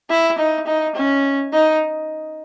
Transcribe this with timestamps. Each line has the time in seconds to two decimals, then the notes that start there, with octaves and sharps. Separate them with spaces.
0.10 E4
0.38 D#4
0.67 D#4
0.95 C#4
1.53 D#4